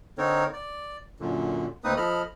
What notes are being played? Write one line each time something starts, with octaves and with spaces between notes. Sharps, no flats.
D3 C4 D#4 A#4 C#5
D5
F#2 A#2 D3
D2 A#3 C4 D#4 B4 D#6
F3 A4 D#5 B5 F6